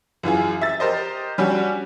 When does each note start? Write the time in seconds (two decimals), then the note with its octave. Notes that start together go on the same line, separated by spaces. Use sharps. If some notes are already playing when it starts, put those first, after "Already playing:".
0.23 F#2 E3 F4 G#4
0.61 E5 A6
0.80 G4 A#4 C5 D#5
1.38 G3 C#4 D4 F#4 G4